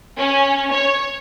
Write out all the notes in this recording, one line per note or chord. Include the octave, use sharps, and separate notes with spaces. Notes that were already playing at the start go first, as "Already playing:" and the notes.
C#4
C#5